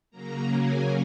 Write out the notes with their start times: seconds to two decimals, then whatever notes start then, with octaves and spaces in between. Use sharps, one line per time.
0.11 C#3 F#3 A#3 A#5
0.50 G#5